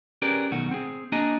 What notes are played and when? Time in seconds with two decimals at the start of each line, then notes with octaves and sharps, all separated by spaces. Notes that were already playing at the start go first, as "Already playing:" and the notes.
0.22 C#4 G4 G#4 A#4 B4 D5
0.51 B1 B2 D#3 A3 F#4 F#5
0.71 C4 G#4
1.12 A#3 D4 F#4 G#4 D#5 A#5